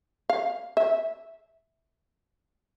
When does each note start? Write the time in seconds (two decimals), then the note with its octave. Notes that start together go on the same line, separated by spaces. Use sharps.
0.30 F5
0.77 E5